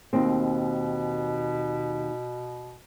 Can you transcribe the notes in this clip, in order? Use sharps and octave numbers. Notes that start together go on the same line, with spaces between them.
D#2 B2 C4